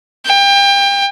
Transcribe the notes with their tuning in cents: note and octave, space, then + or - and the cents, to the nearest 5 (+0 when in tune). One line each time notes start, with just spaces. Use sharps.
G5 +30